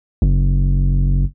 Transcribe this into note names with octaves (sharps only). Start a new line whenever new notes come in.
F#1